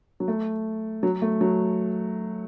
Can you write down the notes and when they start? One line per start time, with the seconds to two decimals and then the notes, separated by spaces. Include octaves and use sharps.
0.20 F#3
0.28 A3
1.03 F#3
1.22 A3
1.41 F#3